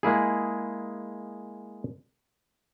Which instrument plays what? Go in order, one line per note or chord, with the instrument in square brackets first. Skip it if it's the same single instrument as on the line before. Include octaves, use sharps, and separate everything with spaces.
[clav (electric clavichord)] G#3 A#3 E4 G#4